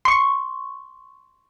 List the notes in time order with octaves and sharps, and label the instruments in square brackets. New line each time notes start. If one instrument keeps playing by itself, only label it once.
[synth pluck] C6 C#6